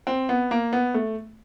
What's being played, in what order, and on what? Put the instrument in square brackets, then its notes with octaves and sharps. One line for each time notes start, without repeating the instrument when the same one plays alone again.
[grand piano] C4
B3
A#3
B3
A3